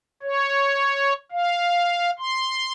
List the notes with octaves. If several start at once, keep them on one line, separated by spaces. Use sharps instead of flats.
C#5
F5
C6